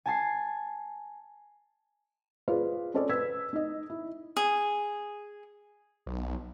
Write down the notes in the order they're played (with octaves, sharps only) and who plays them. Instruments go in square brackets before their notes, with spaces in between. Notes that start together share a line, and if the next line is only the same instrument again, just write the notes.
[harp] G#5 A5 C7
[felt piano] F4 G#4 B4 C5 D5 F5
C4 C#4 A4 C5 D5 D#5
B4 E6 G#6 B6
D#4 D#5
E4
[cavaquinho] G#4
[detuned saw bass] B1